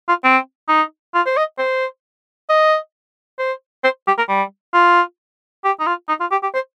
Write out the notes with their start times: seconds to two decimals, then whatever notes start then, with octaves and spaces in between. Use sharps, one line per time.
0.09 F4
0.24 C4
0.69 D#4
1.15 F4
1.26 C5
1.37 D#5
1.58 C5
2.49 D#5
3.39 C5
3.84 C5
4.07 G4
4.18 A#4
4.29 G3
4.74 F4
5.64 G4
5.80 D#4
5.87 F4
6.09 D#4
6.20 F4
6.31 G4
6.43 G4
6.54 C5